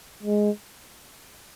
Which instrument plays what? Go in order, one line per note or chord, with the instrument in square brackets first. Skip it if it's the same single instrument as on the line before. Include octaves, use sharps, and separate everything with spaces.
[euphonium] G#3